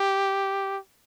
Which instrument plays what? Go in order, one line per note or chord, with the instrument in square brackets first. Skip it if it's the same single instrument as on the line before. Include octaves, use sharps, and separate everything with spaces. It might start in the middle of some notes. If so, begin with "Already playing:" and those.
Already playing: [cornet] G4